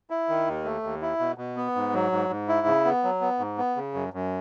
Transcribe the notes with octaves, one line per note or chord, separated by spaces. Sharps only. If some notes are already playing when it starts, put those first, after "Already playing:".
E4
D#3
D#2
A3
D#2
E4
B2
B2
B3
G#2
F#3
G#2
G#2
E4
C#3
B3
F#3
B3
G#2
B3
C#3
F#2
F#2